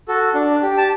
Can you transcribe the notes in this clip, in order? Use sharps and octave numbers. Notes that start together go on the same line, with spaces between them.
F#4 A4
D4
G4
A5